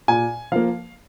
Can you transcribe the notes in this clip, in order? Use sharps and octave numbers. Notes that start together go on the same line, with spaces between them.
A#2 G#5
F3 A#3 F5